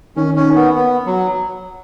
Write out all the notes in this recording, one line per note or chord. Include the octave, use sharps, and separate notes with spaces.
D#3 C#4
C#4
B3
B3
F#3